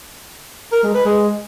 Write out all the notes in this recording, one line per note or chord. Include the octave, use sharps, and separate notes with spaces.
A#4
G#3
B4
G#3